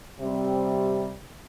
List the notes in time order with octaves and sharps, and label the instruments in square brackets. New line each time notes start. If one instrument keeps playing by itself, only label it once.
[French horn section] C3 G3 C4